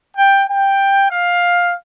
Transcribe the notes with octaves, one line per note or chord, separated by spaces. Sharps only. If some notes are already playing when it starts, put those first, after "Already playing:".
G5
G5
F5